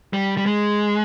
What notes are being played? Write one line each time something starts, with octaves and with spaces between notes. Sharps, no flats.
G3
G3
G#3